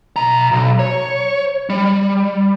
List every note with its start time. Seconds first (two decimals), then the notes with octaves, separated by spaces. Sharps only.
0.16 B2 A#5
0.52 B1
0.79 C#5
1.70 G3